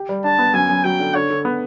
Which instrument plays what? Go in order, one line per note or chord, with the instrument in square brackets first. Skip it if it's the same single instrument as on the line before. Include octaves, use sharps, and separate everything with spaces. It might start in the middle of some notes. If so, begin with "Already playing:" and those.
Already playing: [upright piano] G4
G3
[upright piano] D4 [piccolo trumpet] A5
[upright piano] B3
[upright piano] F#2 [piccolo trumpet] G#5
[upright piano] F#2
[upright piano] F#3 [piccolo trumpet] G5
[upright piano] D3
[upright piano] D3 [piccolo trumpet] C#5
[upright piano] D3
B3